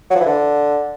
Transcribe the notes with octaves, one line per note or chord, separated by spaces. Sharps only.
F#3
F3
E3
D3